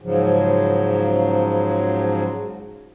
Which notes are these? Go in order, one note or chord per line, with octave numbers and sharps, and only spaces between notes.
G#2 C#3 F3 F#3